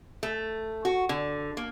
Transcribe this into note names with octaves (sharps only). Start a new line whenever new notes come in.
A3
F#4
D3
A#3